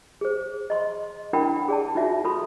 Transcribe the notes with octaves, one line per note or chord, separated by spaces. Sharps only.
G#4 C5
D#5 C6
D4 E4 A#4 F#5 G5 B5
G#4 D5 A5
D#4 F4 F#4 E5
F4 A4 B5 C6